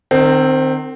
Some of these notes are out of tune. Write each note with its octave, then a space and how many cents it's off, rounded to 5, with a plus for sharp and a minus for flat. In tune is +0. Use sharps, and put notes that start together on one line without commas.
D#3 -35 C4 +0